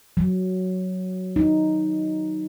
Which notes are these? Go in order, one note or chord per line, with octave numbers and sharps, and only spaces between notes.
F#3
D#4